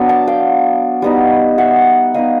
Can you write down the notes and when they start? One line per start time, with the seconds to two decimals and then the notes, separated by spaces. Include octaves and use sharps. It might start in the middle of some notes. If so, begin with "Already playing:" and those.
Already playing: F#3 B3 D4
0.09 G5 A5
0.27 F5 G5
1.02 G3 B3 D#4
1.58 E5 F#5
2.14 G3 B3 D#4 D#5 F5